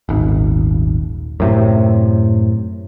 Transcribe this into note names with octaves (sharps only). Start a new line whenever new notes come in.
D#1 G#1
F#2 A2 C3